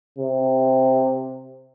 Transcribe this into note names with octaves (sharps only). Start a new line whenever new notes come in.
C3